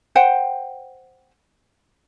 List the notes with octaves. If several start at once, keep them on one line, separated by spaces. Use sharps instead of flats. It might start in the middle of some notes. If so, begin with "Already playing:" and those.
C5 F#5 G5